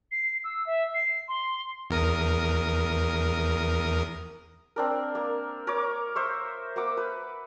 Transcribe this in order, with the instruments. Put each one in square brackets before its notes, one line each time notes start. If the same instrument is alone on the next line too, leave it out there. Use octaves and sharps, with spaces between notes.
[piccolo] C7
E6
E5
C7
C6
[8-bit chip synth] E2 A#4 D#6
[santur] C4 D4 A#4
A#3
A#4 C#5 D6
C5 E5 C#6
A#3 F#5 D6 E6
B4